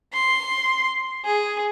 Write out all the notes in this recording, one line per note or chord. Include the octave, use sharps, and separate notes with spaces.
C6
G#4